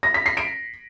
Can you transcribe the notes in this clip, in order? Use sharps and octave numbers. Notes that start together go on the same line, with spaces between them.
A#6
B6
C7
D7